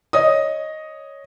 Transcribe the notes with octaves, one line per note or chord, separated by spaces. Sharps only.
C#5 D#5 D#6